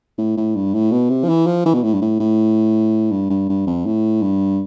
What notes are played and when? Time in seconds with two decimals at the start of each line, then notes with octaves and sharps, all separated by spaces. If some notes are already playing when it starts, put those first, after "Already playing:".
0.18 A2
0.37 A2
0.56 G2
0.74 A2
0.92 B2
1.09 C3
1.24 F3
1.29 E3
1.46 F3
1.66 E3
1.74 B2
1.83 A2
1.93 G2
2.02 A2
2.20 A2
3.12 G2
3.30 G2
3.49 G2
3.67 F2
3.86 A2
4.22 G2